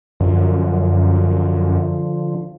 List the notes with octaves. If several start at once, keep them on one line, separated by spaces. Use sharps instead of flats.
F#2 D3 F3